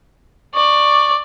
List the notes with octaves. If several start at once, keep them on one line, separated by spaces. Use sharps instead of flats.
D5 C#6